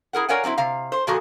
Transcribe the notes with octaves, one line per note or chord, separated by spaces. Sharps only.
E4 G#4 A#4 F#5
A#4 C#5 D5 F5 F#5 G#5
F#3 C4 D#4 E4
C3 F5
C5
A#2 F3 F#4 G#4 A4